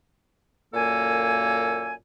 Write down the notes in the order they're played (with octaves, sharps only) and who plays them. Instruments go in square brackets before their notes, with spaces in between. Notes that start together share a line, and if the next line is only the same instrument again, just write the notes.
[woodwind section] F#2 A#2 A#3 A4 G#5